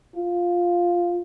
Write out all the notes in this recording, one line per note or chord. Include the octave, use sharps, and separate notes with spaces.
F4